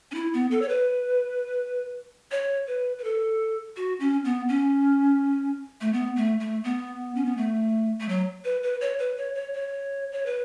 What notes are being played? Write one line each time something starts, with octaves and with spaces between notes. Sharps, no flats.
C#4
E4
B3
A4
C#5
B4
C#5
B4
B4
A4
F#4
C#4
B3
C#4
A3
B3
A3
A3
B3
C#4
B3
A3
A3
F#3
B4
B4
C#5
B4
C#5
C#5
C#5
C#5
B4